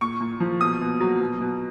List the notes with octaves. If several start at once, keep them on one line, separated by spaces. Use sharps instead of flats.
A#2 C#6
A#2
F3
B2 D#6
B2
F#3
B2
B2